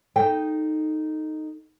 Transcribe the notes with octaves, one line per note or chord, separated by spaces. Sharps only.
D#4 A4 G5